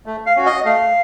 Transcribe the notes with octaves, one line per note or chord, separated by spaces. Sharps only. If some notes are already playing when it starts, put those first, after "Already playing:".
A3
F5
C#4 F#4
D#5
A3 F5